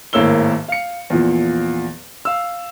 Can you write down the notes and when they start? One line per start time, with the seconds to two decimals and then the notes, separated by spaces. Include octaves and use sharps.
0.13 G#1 A2 A#3 C#5 E6 G7
0.68 F5 C#7
1.10 E2 A#2 F3
2.25 F5 E6